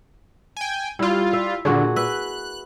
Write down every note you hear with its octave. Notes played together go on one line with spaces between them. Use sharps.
G5 G#5
G3 E4 F4
E5
A#2 D3 F#4 G#4
B4 E5 F#6